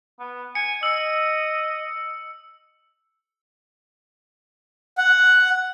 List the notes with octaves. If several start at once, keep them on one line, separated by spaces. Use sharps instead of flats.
B3
G#5 C#7
D#5 E6 C#7
F#5